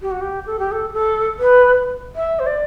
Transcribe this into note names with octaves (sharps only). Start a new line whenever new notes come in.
G4
F#4
G4
A4
G4
A4
A4
B4
E5
C5
D5